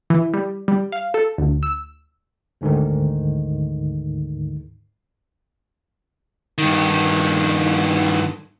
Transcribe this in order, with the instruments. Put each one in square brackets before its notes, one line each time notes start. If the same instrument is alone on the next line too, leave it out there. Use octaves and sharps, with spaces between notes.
[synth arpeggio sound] E3
G3
G3
F5
A4
D2
E6
[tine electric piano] D2 G#2 D3 D#3
[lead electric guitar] G2 D#3